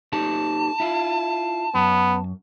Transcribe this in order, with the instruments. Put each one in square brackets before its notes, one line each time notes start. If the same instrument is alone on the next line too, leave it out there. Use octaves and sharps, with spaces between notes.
[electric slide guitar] D#4 G4 A4 [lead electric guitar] A5
[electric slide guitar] E4 F4
[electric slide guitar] F#2 [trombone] B3